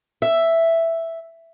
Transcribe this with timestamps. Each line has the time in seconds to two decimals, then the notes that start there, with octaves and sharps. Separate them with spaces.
0.22 E5